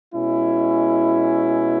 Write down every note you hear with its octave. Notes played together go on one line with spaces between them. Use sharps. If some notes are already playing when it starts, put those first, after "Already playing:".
B2 G#3 C#4 E4